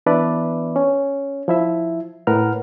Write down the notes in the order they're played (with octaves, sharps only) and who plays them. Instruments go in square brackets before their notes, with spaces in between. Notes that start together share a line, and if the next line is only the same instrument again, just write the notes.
[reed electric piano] E3 B3 D4 B4 D5 E5
C#4
F3 E4 E5
A2 A#4 B4 F#5 F6